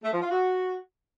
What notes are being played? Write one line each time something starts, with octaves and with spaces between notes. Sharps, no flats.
A3
F3
F4
F#4